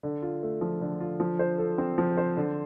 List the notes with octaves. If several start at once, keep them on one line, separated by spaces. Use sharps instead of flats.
D3
F4
A3
F3
D3
F4
F3
C5
A4
C4
F3
C5
D3